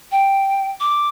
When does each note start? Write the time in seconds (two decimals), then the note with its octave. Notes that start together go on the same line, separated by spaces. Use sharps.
0.11 G5
0.80 D6